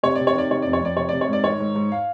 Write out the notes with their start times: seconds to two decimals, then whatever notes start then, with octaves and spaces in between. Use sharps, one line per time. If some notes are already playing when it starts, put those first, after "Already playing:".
0.03 C3 C#5
0.15 C3 D5
0.27 C#5
0.34 D#3 D5
0.50 C3 C#5
0.62 F2 D5
0.73 C#5
0.81 F2 D5
0.97 C3 C#5
1.09 C3 D5
1.21 C#5
1.28 G#2 D5
1.44 D#3 C#5
1.60 G#2
1.75 G#2
1.92 F5